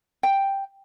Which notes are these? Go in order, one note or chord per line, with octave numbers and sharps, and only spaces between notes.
G5